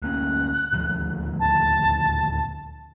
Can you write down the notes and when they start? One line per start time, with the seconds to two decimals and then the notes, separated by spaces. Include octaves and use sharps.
0.02 D2 A#3 C#4 F#6
0.73 D#1 D2 F3
1.40 A5